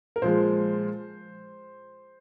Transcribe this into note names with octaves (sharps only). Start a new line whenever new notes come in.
A#4
A#2 F3 G#3 C5